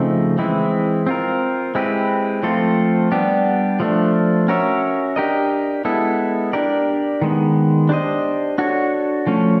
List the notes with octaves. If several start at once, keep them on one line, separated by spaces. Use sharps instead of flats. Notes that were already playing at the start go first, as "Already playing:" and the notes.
Already playing: C#3 F3 A3 C4 D#4
E3 G#3 C4 E4
C4 F4 A#4
G#3 C4 E4 G4 B4
F3 A3 C4 F4 A4
G3 B3 D4 G4
F3 A3 D4
C#4 F#4 A#4 C#5 E5
D4 G4 A#4 D#5
G#3 B3 E4 A4
D4 G4 A#4 D5
D#3 G#3 B3
D4 G4 C5 D#5
D4 F#4 A4 C#5
F3 A3 C#4